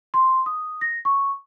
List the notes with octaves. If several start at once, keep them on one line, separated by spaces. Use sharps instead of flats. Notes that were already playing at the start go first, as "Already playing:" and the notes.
C6
D#6
A#6
C#6